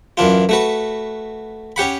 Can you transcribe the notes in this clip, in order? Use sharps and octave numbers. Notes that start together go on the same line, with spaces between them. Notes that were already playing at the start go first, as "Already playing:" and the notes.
F#2 E3 D4 F4
A3 F#4 B4
C#4 G4 F#5 B5